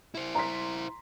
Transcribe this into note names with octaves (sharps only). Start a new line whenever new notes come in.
E4 C5
A#5 C6 B6